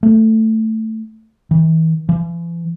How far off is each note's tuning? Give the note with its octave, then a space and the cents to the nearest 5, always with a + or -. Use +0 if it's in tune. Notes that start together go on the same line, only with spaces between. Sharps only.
A3 +10
E3 -40
E3 +45